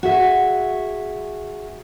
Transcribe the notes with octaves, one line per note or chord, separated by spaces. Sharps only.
F#4 G#4 E5